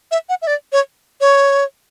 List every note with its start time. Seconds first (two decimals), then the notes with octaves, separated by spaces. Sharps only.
0.11 E5
0.29 F#5
0.42 E5
0.47 D5
0.72 C#5
1.21 C#5